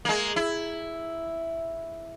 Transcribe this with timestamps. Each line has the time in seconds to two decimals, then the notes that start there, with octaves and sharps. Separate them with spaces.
0.05 G#3 A#3
0.36 E4